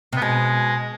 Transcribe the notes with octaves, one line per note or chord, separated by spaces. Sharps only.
C3 B3
B2 G#3